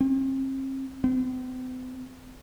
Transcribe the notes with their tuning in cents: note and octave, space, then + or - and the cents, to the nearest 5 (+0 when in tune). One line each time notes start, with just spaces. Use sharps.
C4 +40
C4 -45